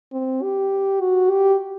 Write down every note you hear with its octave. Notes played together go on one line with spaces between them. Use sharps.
C4
G4
F#4
G4